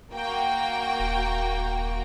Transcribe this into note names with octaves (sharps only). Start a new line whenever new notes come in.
A#3 F#4 G5
D#1